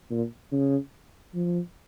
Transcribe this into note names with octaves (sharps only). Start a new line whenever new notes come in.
A#2
C#3
F3